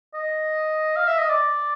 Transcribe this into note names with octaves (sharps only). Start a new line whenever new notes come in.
D#5
F5
E5
D#5
D5